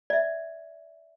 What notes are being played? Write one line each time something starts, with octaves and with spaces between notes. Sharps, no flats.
D5 E5